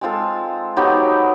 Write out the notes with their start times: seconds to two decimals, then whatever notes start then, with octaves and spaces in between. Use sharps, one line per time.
0.01 G#3 C4 F4 A4
0.77 F#3 B3 D#4 G4